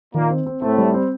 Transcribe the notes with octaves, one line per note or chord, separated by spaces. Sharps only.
A#2 D#3 A#3
C4
C4
A2 A3 C4
G3
C4